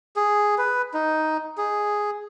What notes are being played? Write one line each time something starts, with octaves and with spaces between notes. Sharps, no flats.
G#4
B4
D#4
G#4